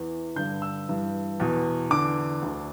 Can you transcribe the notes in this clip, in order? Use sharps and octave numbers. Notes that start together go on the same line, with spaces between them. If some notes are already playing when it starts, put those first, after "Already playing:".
Already playing: E2 E3
G2 D3 G6
E6
G2 E3
E2 B2
E2 D3 D6
D2 D3